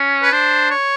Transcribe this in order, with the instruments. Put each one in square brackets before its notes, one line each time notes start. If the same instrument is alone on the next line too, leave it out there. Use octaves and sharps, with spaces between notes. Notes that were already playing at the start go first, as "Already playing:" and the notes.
Already playing: [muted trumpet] C#4
[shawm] B4
[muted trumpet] D4 [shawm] C5
[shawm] C#5